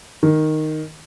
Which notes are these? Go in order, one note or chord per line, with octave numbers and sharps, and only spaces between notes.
D#3